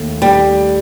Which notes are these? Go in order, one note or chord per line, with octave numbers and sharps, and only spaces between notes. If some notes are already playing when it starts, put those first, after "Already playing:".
Already playing: D#2 A3
D#2 G3